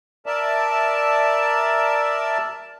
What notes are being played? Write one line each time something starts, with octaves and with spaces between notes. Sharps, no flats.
A#4 D5 E5 A5